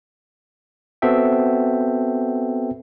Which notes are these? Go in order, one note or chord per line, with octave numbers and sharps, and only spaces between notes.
B3 C4 F#4 A4 E5 G5